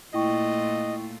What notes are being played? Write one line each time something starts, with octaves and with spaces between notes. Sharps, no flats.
A#2 A3 E4 F4 D#5 G5 C#6